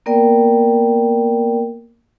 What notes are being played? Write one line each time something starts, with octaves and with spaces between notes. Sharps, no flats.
A#3 B3 A#4 D5 G5